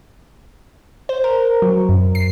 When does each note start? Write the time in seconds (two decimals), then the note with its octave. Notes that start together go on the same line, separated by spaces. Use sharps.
1.09 C5
1.24 A#4
1.62 F#3
1.89 F#2
2.15 C7